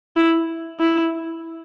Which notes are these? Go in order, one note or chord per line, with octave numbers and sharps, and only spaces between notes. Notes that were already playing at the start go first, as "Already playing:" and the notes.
E4
E4